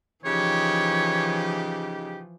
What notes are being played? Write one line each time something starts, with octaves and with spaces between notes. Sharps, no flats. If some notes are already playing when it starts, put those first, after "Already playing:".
C#3 E3 F3 D#4 G4 C#5